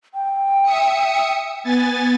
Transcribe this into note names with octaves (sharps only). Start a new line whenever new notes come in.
G5
E5 D#6 C#7
B3 G#5 A6